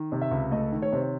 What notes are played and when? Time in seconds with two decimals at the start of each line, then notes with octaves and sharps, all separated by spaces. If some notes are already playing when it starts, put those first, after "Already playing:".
Already playing: D#3
0.12 C3
0.22 E5
0.31 C#2
0.51 A3 D#5
0.72 D#3
0.82 C#5
0.93 C3 C5
1.02 C#5